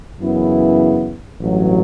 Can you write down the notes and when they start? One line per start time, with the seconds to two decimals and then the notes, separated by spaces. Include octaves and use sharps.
0.21 F#2 C#3 E3 B3 E4
1.40 A1 G2 F#3